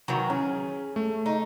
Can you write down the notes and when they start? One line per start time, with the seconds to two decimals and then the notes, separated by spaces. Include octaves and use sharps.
0.08 D#3 E3 F#3
0.30 C#4 G#4
0.96 A3
1.26 D#4